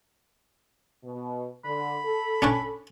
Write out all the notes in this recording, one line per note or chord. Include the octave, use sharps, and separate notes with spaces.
B2
D3 B5
A4
C#4 D4 C#5